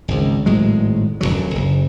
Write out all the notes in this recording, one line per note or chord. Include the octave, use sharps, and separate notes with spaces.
G#1 C#2
G#1 A2 F#3 G#3
D#1 D#2 D3 F#3
F#1